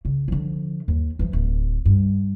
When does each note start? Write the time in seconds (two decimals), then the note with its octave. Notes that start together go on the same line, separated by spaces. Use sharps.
0.05 C#3
0.28 D3 F3
0.88 D#2
1.19 E3 F3
1.33 D1
1.85 G2